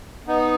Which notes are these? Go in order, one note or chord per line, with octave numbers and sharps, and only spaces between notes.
B3 D#4